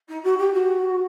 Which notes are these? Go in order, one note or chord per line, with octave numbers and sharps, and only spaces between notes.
D#4
F#4
G4
F#4